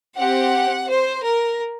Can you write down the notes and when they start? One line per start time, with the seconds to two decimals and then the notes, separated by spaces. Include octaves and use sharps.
0.17 C4 G4 F#5
0.89 C5
1.24 A#4